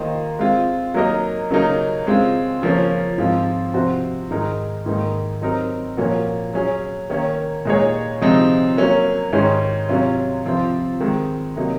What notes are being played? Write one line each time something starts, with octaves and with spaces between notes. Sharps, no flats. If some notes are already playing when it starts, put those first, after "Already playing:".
Already playing: D#3 A#3 F4 C5 D#5
G#3 C4 F4
F#3 A#3 D#4 A#4 D#5
C#3 F#3 A#3 D#4 A#4
C#3 G#3 C4 F4
C#3 F3 A#3 C#4
G#2 F3 C4 F4
C3 F3 C4 F#4 C5
G#2 D#3 G#3 D#4 A#4
G#2 D#3 A#3 D#4
F#3 C4 D#4 A#4
A#2 F3 A#3 C#4 F#4
F#3 C#4 G#4
D#3 A#3 C#4
A#2 G#3 D#4 G#4 C#5
C3 F3 G#3 C4 D#4
F#3 A#3 C#4
G#2 D#3 G#3 C#4
C3 F#3 C#4 F4
C3 F3 C4 F4 C5
D#3 G#3 C4
C3 F#3 A#3 D#4